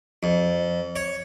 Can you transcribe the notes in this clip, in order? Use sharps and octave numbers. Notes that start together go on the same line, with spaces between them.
F2
C#5